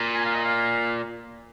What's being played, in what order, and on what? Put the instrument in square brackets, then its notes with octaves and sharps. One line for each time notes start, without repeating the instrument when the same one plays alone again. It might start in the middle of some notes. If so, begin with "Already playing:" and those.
Already playing: [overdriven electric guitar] A#2
[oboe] G#5
F5
D#5
F5